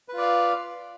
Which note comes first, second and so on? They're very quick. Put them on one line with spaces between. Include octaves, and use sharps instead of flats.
B4 F4 D5 F5